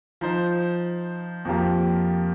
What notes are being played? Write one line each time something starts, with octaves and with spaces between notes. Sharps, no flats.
F3 D#4 C5
F2 F3 A#3 G4